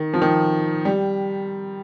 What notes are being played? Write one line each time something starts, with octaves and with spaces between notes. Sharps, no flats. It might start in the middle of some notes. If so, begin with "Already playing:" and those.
Already playing: D#3
F3
D#3
G3